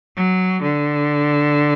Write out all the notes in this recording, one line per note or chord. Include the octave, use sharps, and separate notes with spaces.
F#3
D3